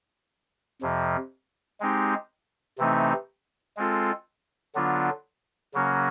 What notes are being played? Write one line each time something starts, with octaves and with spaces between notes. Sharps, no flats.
F2 C3 F3
G#3 C4 D#4 G4
C3 E3 A3 C4 D#4
G#3 C4 F4 A4
D3 F#3 B3 D4 F4
C#3 F#3 A#3 C#4 F#4